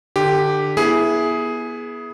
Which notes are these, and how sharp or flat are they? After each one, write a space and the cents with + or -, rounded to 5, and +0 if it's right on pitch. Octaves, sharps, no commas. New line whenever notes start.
D3 +20 G4 +0
B3 -25 E4 +0 G#4 +10